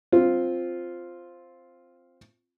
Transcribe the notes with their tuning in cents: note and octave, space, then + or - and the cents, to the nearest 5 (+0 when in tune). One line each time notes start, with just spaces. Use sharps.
C4 +0 F4 +0